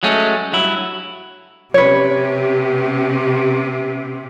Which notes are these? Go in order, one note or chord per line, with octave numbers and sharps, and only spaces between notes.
F#3 G#3 A3 C#4
G2 F#3 E4
C3 B3 C#4 G4 B4 C#5